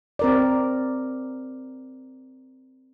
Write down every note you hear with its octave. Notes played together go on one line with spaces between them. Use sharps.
C4 A#4 D5